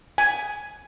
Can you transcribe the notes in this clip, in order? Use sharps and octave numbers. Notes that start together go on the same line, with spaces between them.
G#5